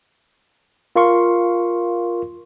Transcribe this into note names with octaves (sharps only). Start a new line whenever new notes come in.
F4 A#4 F5 C6 C#6